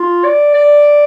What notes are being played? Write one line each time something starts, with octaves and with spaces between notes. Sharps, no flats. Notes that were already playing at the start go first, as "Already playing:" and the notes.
Already playing: F4
D5
D5